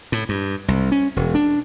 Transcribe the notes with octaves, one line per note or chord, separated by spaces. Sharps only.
A2
G2
C2
C#4
E1
D4